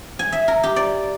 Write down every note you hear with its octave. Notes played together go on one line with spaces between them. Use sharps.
G#5
E5
A#4
G4
D5